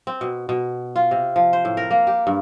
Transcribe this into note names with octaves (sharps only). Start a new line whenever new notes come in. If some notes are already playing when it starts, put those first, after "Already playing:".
C4
B2
B2
F4
C3
F3
C5
A2
A#4
A#3
G4
G2